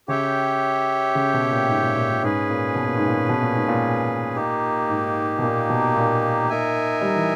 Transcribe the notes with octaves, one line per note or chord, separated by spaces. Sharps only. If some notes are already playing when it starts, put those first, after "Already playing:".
C#3 G4 C#5 E5 G5
C#3
B2
A#2
G#2
A#2
A#2
A#2
G#2 C#4 G#4 B4
A#2
B2
A#2
G#2
A#2
B2
A#2
G#2
A#2
A#3 D#4 G4
G#2
B2
A#2
B2
A#2
D#4 A#4 E5 G#5
G3
E3